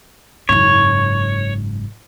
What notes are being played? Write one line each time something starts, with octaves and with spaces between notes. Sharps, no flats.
F#1 G#2 C#5